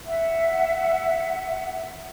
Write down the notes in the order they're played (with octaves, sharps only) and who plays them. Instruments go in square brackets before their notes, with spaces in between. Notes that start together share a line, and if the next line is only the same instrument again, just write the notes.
[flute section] E5 F#5